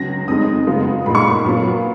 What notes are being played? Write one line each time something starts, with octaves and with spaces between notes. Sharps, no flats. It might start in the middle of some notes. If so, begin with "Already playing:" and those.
Already playing: C#2 C#3 F#3 A#6
F2 D#3 G#3 D#4 D#6
F#2 C#3 G#3 B3 F4
A#2 G#3 D#4 B5
C#6
B5
A#2 F#3 B3 F4